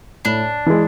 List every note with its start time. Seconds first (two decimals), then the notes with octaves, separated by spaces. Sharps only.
0.25 A2 D4
0.66 E3 G#3